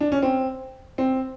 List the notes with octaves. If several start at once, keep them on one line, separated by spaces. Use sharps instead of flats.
D4
C#4
C4
C4